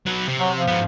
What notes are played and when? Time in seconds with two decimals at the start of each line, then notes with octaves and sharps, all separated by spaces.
0.07 F#3 B4
0.28 C3
0.40 F#3
0.56 F3
0.68 G#2 B3